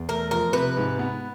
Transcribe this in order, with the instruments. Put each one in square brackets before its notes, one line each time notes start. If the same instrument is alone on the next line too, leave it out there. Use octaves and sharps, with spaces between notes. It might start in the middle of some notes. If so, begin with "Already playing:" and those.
Already playing: [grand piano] E2
[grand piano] A3 [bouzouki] A#4
[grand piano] F3 [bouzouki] A#4
[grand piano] C3 [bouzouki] B4
[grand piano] G#2
B3